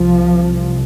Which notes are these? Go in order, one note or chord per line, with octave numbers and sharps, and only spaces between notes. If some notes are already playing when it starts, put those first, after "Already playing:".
Already playing: C2 C3 F3